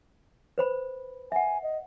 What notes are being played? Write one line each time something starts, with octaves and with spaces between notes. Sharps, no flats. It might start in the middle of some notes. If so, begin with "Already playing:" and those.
B4 C5 B5
E5 F#5 G#5
D#5